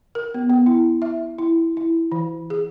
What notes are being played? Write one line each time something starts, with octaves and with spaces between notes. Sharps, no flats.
A#4
B3
B3
E4
E5
E4
E4
E3
G#4